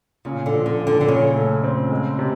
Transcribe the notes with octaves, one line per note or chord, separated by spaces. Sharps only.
A#2 C#3
D3
F3
D3
A#2
D3
D3
A#2 C#3
A3
C4
G#3
C3